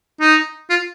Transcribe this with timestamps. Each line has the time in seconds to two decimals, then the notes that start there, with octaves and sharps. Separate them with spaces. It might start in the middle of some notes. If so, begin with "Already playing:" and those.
0.21 D#4
0.70 F4